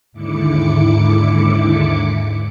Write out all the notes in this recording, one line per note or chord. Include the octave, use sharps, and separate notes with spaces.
D#2 G#2 D3 E4 D6 C#7